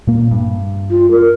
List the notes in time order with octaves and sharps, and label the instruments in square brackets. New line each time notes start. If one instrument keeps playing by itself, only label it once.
[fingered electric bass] A#2 A#3
G2
[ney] F4
A#4